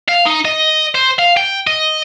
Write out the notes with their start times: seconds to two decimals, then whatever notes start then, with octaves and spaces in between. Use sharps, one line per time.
0.08 F5
0.26 D#4
0.45 D#5
0.95 C5
1.19 F5
1.37 G5
1.67 D#5